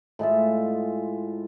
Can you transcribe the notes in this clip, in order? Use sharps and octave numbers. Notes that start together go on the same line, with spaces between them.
A2 G#3 F4 E5